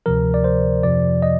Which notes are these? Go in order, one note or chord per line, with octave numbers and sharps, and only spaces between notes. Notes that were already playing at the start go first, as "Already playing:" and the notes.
D2 C3 F3 A#4
D5
C5
F2 C3 F3 D5
D#5